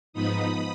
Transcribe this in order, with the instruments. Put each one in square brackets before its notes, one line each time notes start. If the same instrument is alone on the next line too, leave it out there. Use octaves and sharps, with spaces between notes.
[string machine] G#2 F3 B3 D#4 B5 D#6